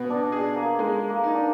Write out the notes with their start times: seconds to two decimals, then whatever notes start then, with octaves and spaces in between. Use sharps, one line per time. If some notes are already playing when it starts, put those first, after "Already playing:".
Already playing: B2 B3
0.10 D4
0.32 G#4
0.56 A#3
0.79 G#3
1.09 A#3
1.24 D#4
1.34 D4